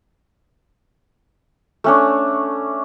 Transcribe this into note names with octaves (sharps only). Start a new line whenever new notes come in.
A3 C#4 D4